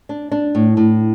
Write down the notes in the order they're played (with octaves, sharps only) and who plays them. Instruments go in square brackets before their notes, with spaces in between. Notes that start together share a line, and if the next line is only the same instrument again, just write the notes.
[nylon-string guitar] D4
D4
A2
A2